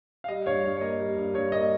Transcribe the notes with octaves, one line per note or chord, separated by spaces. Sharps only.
F5
G3 D#5
G2 C#5 F5
G2
C#5
A#3 D#5
G3
G2
G2 C#5
A#3 D#5